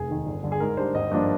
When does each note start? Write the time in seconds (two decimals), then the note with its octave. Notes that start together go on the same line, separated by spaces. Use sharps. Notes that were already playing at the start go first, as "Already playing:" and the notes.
Already playing: F1 G#4
0.09 D#2 D#3
0.26 G1
0.44 G2 D3
0.52 G#4
0.60 G#2 A#4
0.77 G3 D4 C5
0.95 G#1 D#5
1.12 G2 F3 A#3 D4